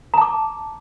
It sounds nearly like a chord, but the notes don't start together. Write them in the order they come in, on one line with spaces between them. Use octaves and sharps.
A#5 A5 D6